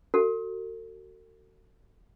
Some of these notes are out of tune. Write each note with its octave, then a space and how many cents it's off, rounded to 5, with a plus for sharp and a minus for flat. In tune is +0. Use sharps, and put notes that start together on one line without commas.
F#4 +15 A4 +40